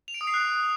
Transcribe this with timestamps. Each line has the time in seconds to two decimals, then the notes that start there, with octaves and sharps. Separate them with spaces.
0.08 F7
0.14 D7
0.21 D#6
0.27 C7
0.34 F#6